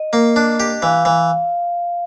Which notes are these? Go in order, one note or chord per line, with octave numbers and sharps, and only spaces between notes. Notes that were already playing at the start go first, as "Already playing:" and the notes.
Already playing: D#5
A#3
D4
G4
E3 F5
E3